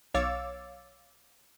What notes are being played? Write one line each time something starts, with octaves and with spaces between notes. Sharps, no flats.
B1 C#5 F5 D6 E6 A6